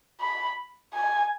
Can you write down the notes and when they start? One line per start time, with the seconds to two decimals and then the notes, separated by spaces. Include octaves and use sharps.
0.21 B5
0.94 G#5